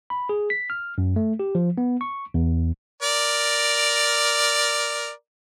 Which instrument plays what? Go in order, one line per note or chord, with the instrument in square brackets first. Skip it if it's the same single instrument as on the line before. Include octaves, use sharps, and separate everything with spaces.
[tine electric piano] B5
G#4
B6
F6
F#2
A3
G4
F3
B3
C#6
E2
[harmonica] A#4 D5